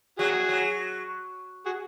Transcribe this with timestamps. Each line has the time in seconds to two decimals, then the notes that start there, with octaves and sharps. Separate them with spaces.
0.19 F#3 F#4 G#4
0.49 F#3
1.66 F#4 G#4